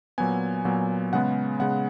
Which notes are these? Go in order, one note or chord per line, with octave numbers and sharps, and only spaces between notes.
A#2 F#3 B3 G#5
A#2 F#3 B3
C#3 G#3 B3 F#5
C#3 G#3 B3 F#5